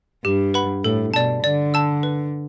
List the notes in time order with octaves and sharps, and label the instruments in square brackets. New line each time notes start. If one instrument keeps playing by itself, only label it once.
[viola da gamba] G2 [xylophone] G4
[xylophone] B4 F#5 B5
[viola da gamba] A2 [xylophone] A4
[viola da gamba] B2 [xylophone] D5 A5
[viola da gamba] D3 [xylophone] D5
[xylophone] A5 E6
B4